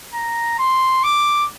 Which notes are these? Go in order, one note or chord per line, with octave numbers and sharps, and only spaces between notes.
A#5
C6
D6